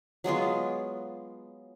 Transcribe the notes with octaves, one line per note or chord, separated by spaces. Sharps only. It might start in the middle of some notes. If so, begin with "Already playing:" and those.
F#3 G#3 B3 F4